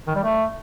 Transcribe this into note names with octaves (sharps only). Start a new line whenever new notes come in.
D#3
G3
A3